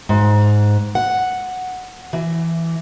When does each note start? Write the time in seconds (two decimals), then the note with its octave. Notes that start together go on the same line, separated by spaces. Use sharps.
0.09 G#2
0.95 F#5
2.13 E3